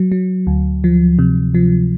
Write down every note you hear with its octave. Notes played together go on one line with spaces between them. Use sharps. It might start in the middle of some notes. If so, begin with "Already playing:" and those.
Already playing: F#3
F#3
D2
F3
C3
F3